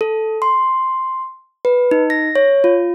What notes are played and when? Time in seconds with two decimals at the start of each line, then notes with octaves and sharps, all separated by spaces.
0.01 A4
0.42 C6
1.65 B4
1.91 D#4
2.10 A#6
2.35 C#5
2.64 F4